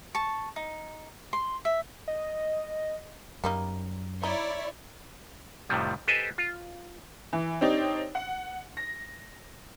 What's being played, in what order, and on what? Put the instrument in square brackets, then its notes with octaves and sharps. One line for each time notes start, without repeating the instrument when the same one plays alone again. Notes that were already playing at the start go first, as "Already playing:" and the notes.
[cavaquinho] A5 C#6
D#4
C6
E5
[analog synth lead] D#5
[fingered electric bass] F#2 [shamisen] G3 A#3 D#4
[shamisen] D#4 [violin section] E4 C#5 D5
[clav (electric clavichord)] F2 A2 C3 D#3 F3 G3
G4 A4 B4 C5 D#5 G#5
F4
[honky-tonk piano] E3
C4 D4 D#4 G4 C#5
F#5
A#6